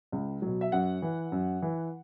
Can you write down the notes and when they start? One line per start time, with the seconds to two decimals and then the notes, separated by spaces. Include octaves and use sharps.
0.12 C#2
0.42 B2 F#3
0.61 E5
0.72 F#2 F#5
1.02 E3
1.32 F#2
1.62 E3